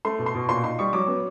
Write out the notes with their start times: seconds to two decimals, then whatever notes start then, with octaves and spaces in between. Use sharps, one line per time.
0.05 A3 C6
0.19 B2
0.26 C6
0.35 B2
0.49 A#2 C6
0.64 D#4 C6
0.79 G3 C#6
0.93 F#3 D6
1.08 B3